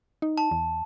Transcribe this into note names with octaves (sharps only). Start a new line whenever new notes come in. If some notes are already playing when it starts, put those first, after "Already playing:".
D#4
A5
E2